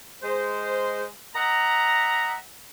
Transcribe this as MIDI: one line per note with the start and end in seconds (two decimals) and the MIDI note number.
0.23 1.05 56
0.23 1.05 72
1.35 2.35 75
1.35 2.35 76
1.35 2.35 78
1.35 2.35 82